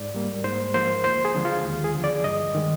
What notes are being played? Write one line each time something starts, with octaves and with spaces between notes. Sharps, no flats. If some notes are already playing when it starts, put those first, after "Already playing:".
Already playing: G#2 D5
G3 A#3
G#2 C5
F3 A#3 C5
D2 C5
G#4
D3 F3 G#3
F4
D#2
G#4
D3 F3
D5
G2 D#5
D#3 G#3